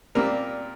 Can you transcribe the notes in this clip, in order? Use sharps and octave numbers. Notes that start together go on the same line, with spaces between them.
A#2 G3 C4 A#4